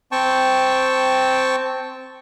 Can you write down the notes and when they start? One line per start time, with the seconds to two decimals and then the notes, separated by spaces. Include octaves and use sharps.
0.12 C4 G5 A5 C#6